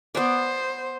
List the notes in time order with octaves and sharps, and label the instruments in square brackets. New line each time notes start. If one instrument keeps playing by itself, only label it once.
[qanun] B3 D5 [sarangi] C5